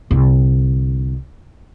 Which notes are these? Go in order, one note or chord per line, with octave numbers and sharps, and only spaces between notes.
C2 D3